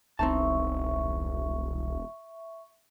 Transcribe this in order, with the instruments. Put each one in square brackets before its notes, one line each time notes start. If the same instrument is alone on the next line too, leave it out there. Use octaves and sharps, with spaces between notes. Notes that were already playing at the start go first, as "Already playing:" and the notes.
[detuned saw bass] E1 [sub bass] C2 [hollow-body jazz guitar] C4 D#4 A5 [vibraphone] E5 C#6